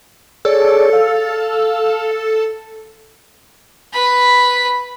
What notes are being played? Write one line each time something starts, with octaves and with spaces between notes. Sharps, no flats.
G#4 A4 C#5 D5
F5
B4 B5